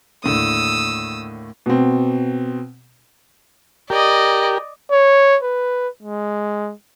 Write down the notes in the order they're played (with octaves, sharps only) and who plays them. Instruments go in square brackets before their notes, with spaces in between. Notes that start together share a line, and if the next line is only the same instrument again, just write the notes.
[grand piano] D#2 A2 D3 [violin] D#6 E6
[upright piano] B2 C4
[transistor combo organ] G4 A#4 [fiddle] D5 D#5
[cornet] C#5
B4
G#3